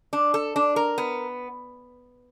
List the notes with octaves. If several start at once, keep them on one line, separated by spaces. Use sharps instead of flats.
D4
A4
D4
A#4
B3